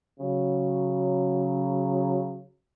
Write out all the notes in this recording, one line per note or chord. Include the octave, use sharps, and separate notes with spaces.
C#3 F#3